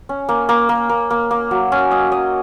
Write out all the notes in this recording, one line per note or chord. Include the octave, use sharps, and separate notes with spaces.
C#4
A#3
A#3
A#3
A#3
A#3
A#3
F#3
C#4
D#5
D#5